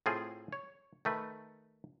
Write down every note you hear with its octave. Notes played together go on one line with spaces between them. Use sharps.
A2 C4 F4 G#4
C#5
D#3 A3 B4